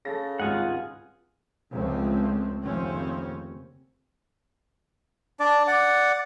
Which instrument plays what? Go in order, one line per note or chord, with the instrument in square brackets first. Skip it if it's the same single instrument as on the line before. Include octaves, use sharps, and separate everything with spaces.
[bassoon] C#3 [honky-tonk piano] A4 A6 A#6
[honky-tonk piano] G#1 C#2 G3 [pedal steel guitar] F4 G#4 F#5
[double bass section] F1 C#2 C#3 A3 C4
F1 D#2 C#3 C4 C#4
[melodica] D4 D5
D5 F#5